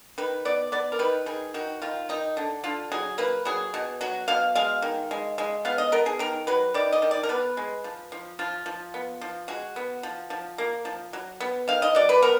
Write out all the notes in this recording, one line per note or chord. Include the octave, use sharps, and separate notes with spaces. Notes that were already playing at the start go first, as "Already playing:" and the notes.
D#3 B4
B3 D5
B3 D5
A#4
D#3 B4
D#3 G#4
D#3 F#4
D#3 F4
D#3 D#4
D3
D3 F4
F#3 G#4
A#3 B4
F#3 G#4
B2
F#3 F#4
B2 F5
G#3 F5
D#3
G#3
G#3
B3 F5
D#5
B3 A#4
G#4
D#3 A#4
F#3 B4
D#3 D5
D#5
D#3
D5
A#4
B3 B4
G#3
F3
F3
F3 F4
F3
B3
F3
G#3 F#4
B3
F3
F3
A#3
F3
F#3
B3
D#3 F5
D#5
F#3 D5
B4
B3 A#4